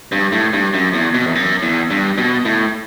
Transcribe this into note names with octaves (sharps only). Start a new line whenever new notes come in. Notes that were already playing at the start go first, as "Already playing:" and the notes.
G2
A2
G2
F#2
E2
B2
E2
F#2
E2
G2
B2
A2